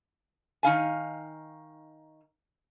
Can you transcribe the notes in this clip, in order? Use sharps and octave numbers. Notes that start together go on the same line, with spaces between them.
D#3 D#4 F5 G#5